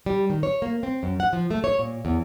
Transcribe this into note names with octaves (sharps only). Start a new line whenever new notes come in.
G3
D#3
C#5
A#3
C4
F#2
F#5
F3
A3
C#5
A#2
E2